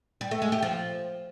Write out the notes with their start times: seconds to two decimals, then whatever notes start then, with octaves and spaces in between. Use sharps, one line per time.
0.21 G3
0.31 A3
0.42 G#3
0.52 G4
0.62 F3